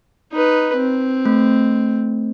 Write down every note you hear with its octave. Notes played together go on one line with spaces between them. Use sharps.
D#4 B4
C4
A3